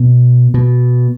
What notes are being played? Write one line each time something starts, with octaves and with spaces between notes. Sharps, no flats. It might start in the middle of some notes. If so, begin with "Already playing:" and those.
Already playing: B2
B2